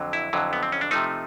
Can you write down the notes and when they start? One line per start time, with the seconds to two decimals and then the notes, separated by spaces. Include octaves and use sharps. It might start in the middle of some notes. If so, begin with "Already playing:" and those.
Already playing: F2 D3 F#3
0.13 E4
0.33 F2 D3 F#3
0.53 B3
0.63 C4
0.72 C#4
0.81 D4
0.91 C3 F3 A3 D#4